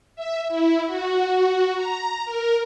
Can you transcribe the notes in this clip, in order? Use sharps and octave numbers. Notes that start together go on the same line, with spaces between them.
E5
E4
F#4
A#5
A#4